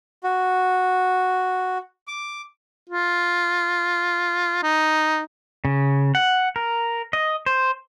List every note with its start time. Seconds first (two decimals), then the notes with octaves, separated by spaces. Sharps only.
0.24 F#4
2.07 D6
2.89 F4
4.63 D#4
5.65 C#3
6.15 F#5
6.56 A#4
7.13 D#5
7.46 C5